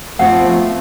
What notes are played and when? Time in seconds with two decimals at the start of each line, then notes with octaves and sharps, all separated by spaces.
0.19 F3 A3 B3 C4 F#5